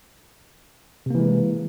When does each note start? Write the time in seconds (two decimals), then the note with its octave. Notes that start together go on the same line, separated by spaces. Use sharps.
1.06 C3
1.10 A#3
1.15 E3
1.19 G#3